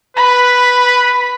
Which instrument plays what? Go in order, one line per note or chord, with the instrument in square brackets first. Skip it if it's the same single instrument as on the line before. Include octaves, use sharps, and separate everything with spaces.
[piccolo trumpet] B4 [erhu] B5